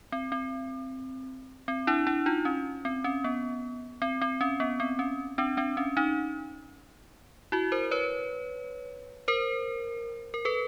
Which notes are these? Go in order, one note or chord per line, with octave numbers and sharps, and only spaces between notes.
C4
C4
C4
D4 E4
D4 E4
D#4 F4
C#4
C4
C#4
B3
C4
C4
C#4
B3
C4
C#4
C4 D4
C4 D4
C#4
C#4 D#4
E4 F#4
A#4 C5
B4 C#5
A#4 C5
A#4
A4 B4